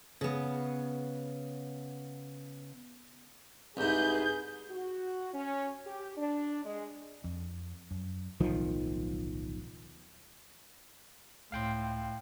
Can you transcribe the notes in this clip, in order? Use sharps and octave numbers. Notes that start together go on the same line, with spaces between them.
C#3 B3
C2 G#2 G#4 B4 G6
F#4
C#4
G4
D4
G#3
F2
F#2
D1 B1 D#3 F3
C#2 A2 C#4 F5 G5 C6